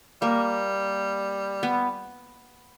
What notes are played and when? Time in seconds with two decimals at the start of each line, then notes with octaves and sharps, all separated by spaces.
0.22 G3 A#3
1.63 B3